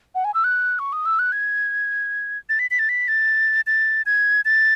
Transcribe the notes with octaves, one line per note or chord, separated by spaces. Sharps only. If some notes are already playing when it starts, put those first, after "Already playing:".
F#5
G#5
E6
F#6
C#6
D#6
E6
F#6
G#6
A6
B6
B6
A6
B6
A6
A6
G#6
A6